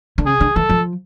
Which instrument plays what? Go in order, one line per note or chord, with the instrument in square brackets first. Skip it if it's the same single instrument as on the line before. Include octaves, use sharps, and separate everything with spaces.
[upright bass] D3
[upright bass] C#3 [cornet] G#4
[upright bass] D3
[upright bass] E3 [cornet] A4
[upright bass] F3